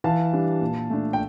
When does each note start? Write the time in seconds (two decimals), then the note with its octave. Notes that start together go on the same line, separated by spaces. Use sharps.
0.04 E3 F5 A5
0.33 G3 D4
0.61 A#2
0.90 A3 D4
1.13 G5